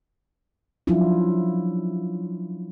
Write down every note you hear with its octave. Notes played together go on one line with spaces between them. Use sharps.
F3 F#3 C#4 D4 E4 F4